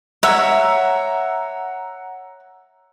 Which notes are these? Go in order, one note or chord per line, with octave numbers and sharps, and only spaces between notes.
C#5 E5 F#5 A#5 E6